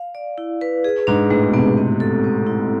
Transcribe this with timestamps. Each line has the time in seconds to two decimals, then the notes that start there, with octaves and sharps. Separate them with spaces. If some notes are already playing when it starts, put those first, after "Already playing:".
Already playing: F5
0.15 D5
0.38 E4
0.61 B4
0.84 G#4
1.07 G#2 D4
1.30 A2 G#3
1.48 B2
1.54 C3 B3
1.77 C4
2.00 A4
2.24 C4
2.46 E4